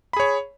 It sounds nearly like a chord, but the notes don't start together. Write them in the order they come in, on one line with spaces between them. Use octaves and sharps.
B5 G#4 C#5